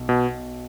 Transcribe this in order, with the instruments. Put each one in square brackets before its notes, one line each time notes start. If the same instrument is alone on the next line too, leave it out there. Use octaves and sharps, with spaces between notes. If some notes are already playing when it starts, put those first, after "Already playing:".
Already playing: [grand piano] B1
[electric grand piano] B2